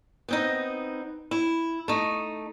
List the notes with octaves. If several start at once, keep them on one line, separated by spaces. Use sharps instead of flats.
B3 C4 D#4
E4
A3 D#4